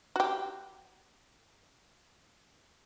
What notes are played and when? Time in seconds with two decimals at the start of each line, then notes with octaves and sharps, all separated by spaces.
0.16 F#4 G4